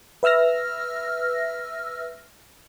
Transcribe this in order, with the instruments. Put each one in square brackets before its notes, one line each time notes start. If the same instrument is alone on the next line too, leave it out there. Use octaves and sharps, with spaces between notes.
[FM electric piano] B4 E5 E6 F6 A#6